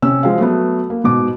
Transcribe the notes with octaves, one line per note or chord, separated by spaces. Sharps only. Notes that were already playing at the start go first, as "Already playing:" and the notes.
C3 C#4 E6
F3 G#3 C4 F5
F#3 A3 B3
A#3
G#2 B2 D6